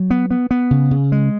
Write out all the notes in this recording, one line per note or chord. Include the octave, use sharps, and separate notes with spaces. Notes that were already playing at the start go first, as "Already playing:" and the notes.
Already playing: F#3
B3
B3
B3
C#3
C#3
G#3